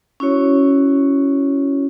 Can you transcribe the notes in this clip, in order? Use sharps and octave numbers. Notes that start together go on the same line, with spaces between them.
C#4 E4 F#4 C#5